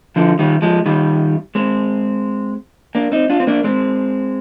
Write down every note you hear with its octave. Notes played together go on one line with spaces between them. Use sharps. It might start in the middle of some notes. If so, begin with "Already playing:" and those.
D3 F3
D#3 G3
F3 G#3
D#3 G3
G#3 C4
A#3 D4
C4 D#4
D4 F4
C4
A#3 D4
G#3 C4